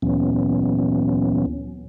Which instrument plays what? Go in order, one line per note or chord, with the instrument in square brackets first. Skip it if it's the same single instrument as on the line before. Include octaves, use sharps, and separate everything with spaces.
[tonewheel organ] D2 A#2 E3 F#3 B3 C#4